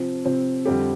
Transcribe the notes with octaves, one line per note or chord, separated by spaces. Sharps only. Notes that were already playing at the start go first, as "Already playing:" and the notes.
Already playing: C3 F3 C4
C3 F3 C4
F2 D3 G3 C4 G4